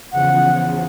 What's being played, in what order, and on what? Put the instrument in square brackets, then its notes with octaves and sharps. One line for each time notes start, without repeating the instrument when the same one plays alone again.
[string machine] E2 C#3 F3 [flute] F#5